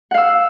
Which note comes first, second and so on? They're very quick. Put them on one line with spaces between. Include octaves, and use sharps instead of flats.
F#5 F5 E6